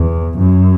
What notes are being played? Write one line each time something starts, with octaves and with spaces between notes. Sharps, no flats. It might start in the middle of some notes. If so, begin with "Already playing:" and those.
Already playing: E2
F#2